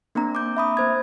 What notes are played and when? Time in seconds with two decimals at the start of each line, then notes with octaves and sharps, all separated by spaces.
0.15 A#3 C4 D4 A#5
0.35 D6 G6
0.57 E5 B5 D#6
0.77 A#3 C5 G#6